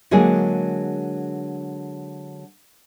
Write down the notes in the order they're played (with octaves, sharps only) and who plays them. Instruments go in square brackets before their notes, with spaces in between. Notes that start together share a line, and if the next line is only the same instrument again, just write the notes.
[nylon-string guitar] D3 F#3 G#3 A#3 G#4